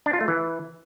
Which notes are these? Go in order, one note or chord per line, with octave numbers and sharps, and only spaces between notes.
D4
F4
A3
E3